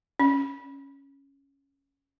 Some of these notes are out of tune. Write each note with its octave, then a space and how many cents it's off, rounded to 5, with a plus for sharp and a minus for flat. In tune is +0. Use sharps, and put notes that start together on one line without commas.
C#4 -5